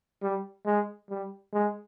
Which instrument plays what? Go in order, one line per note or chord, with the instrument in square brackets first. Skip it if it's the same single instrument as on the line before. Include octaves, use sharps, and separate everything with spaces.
[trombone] G3
G#3
G3
G#3